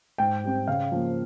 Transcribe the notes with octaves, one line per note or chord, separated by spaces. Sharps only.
G#2 G5
G3 C4
C#3 F5
F3 A#3